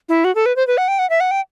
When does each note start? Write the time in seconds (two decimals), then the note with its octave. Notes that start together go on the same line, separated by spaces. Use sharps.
0.09 E4
0.24 F#4
0.35 A4
0.46 B4
0.56 C5
0.67 B4
0.78 F#5
0.88 G5
0.99 F#5
1.10 E5
1.20 F#5
1.31 G5